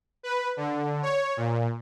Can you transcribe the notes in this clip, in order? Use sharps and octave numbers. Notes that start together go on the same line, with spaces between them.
B4
D3
C#5
A#2